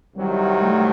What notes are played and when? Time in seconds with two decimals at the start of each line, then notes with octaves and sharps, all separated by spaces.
0.16 C2 C3 D#3 F#3 G3
0.62 A3